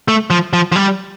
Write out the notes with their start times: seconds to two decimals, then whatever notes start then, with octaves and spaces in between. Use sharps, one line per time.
0.08 A3
0.30 F3
0.53 F3
0.72 F3
0.76 G3